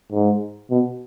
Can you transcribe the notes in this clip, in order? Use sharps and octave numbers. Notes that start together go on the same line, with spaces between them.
G#2
B2